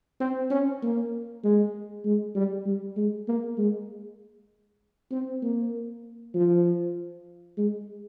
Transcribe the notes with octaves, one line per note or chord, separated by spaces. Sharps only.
C4
C#4
A#3
G#3
G#3
G3
G3
G#3
A#3
G#3
C4
A#3
F3
G#3